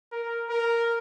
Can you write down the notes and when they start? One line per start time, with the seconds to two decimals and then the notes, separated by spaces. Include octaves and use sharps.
0.12 A#4
0.49 A#4